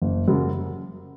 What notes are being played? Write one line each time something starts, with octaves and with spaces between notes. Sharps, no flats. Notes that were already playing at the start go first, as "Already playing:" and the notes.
F#1
F#2 C#3 F#3